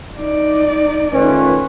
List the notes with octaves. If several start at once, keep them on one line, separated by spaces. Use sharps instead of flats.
D#4 D5
D#3 A3 C#4 F4 B4